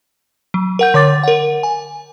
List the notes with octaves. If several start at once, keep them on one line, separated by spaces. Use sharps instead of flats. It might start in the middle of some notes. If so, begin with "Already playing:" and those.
F#3
A#4 F#5 G6
D3 C#5 D6 A6
A#4 F#5
G#5